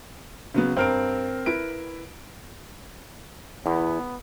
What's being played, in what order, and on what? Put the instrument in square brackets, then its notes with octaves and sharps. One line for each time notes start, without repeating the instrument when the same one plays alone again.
[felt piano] C#3 F#3 B3
[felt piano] G2 F6 D7 [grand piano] C4 A#4
[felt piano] E4 A#4 B4 [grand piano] D7
[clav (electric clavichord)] E2 [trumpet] B3 [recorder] E4